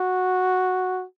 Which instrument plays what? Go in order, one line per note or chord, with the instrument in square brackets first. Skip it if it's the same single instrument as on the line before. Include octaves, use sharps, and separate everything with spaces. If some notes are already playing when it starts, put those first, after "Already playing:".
Already playing: [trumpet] F#4